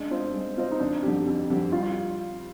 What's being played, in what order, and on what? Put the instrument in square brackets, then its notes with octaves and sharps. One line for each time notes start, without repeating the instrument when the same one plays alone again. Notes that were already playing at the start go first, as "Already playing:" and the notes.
Already playing: [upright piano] G#3 [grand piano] D4
[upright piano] C4 F4 C5 D#5
G#3
C4 F4 C5 D#5
[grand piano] D#4
[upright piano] F2 [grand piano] D4
[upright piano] D3 F3 C4 G4
F2
D3 F3 C4 G4
[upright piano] G3 [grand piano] F4
[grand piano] F4